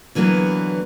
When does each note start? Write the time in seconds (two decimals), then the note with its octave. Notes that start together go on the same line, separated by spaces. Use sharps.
0.15 D3 E3 F#3 A#3 B3